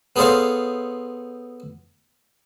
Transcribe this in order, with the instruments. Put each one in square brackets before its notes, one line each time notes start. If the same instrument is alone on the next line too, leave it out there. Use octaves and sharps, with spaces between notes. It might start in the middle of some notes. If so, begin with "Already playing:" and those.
[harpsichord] B3 G#4 A4 C5 C#5 F5